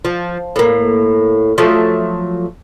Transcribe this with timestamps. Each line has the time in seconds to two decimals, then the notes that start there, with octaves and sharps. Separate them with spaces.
0.05 F3
0.56 A2 A#3
1.58 F3 F#3 A3